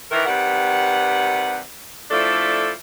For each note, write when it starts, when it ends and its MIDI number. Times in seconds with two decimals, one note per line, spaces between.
0.11 0.24 51
0.11 0.24 52
0.11 0.24 70
0.26 1.57 48
0.26 1.57 51
0.26 1.57 55
0.26 1.57 71
0.26 1.57 78
2.09 2.70 53
2.09 2.70 57
2.09 2.70 62
2.09 2.70 64
2.09 2.70 69
2.09 2.70 74